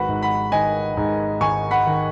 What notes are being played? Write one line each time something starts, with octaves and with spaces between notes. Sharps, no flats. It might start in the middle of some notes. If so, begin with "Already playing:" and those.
Already playing: G#1 F#4 B4 F#5 B5
G#2
F#5 B5
D#3 D#5 G#5
G#2
G#1 G#5 C#6
F#5 B5
D#3